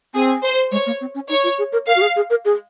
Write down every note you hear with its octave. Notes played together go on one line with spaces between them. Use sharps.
C4 G#4
C5
G#3 C#5
A#3
C4
C#4
D#4 C#5
F4
G#4
A#4
A#4 F5
F#4
G#4
G#4
A#4
G#4